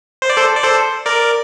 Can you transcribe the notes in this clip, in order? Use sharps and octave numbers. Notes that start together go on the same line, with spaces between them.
C5
D5
A4 C5
D5
A4 C5
A#4 D5